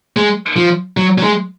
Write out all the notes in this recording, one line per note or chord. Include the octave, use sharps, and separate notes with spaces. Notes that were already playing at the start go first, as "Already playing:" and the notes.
G#3
F3
F#3
F#3
G#3